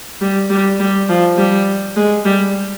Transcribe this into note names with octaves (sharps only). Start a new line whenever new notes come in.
G3
G3
G3
F3
G3
G#3
G3